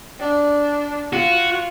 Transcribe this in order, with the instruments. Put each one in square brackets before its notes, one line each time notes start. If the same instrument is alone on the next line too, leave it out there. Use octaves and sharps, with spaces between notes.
[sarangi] D4
[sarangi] F4 [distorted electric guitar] F#4